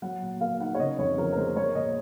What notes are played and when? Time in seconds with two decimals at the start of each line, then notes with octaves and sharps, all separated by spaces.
0.02 F#3 F#5
0.22 A#2
0.41 A#3 F5
0.60 D#4 F#5
0.75 C#5
0.79 C#3 D#5
0.98 F2 C#5
1.18 F3 A#4
1.32 A#4
1.37 G#3 C5
1.56 G#3 C#5
1.75 A#2 D#5